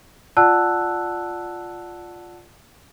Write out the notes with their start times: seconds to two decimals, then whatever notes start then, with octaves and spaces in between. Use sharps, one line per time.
0.37 F4 D5 F#5 A5 E6 F#6